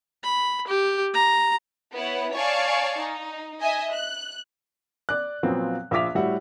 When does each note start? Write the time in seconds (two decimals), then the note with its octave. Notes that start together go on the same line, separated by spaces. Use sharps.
0.24 B5
0.67 G4
1.14 A#5
1.93 B3 E4 B4 C#5 F#5
2.35 C#5 D5 F5 G#5 A5 C#6
3.00 D#4
3.61 D#5 E5 G#5
3.93 F#6
5.09 D5 F#6
5.43 A#2 F3 F#3 B3 C4
5.91 A#1 F4 E5 D6 B6 F7
6.15 A2 G3 F#4 E5 F#5